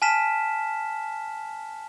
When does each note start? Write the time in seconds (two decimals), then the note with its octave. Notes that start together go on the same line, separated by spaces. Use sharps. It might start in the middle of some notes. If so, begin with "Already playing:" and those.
0.02 G#5 A5 F6 B6 E7